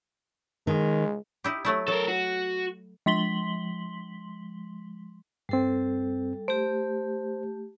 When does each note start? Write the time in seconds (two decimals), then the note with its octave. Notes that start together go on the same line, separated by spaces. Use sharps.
0.67 D#3 G#3
1.44 D#4 E4 G4
1.65 F#3 A3 E4
1.88 F#3 A4 A#4
2.08 F#4
3.06 F3 G#3 C6 B6 F#7 G7
5.49 G2 G3 C4 A4
6.48 A3 G4 C5